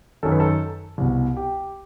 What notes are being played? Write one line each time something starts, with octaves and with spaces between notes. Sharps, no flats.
F#2 D#3 A4
B4
A4
C2 B2
G4